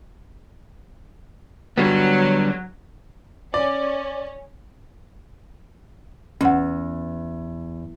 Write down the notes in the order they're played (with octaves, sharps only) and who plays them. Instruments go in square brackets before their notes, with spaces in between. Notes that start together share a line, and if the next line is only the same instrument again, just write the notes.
[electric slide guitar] D3 G3 B3 [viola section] F#3
[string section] C#4 C#5 [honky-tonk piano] D5
[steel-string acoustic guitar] E2 [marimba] C#4 F#5